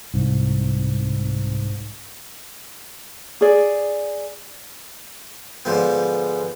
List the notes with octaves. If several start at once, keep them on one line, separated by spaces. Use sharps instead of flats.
C2 G#2
G#4 D5
G#2 D3 F3 B3